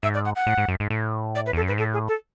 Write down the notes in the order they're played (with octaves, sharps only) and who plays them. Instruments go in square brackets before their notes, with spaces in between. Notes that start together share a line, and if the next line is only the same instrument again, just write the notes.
[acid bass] G#2 [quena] E5
[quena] D5
F#5
F#5
[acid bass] A2
G#2
F#2
G#2
A2
[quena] D5
B4
[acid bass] E2 [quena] A4
[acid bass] F#2
[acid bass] G#2 [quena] B4
[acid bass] A2 [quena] A4
[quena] G#4
A4